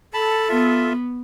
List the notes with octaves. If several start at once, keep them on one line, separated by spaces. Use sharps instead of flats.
A4 A5 B5
B3 F4 E5